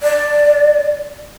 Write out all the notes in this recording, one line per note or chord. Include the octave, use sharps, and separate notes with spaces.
D5